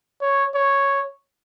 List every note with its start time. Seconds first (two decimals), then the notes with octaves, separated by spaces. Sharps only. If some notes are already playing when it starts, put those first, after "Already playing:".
0.21 C#5
0.55 C#5